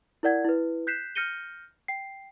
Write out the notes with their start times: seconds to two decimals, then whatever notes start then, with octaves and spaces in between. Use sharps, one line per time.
0.23 E4 A#4 D5 F#5 G#6
0.44 E4 B4
0.87 F#6 G6 B6 C7 E7
1.15 F6 G6 A#6 C#7 D#7 G7
1.88 G5 C7